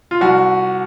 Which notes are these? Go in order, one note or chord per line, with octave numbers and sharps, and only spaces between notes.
F4
C2 F#4